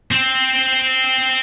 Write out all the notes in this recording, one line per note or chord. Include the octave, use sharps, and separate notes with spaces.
C4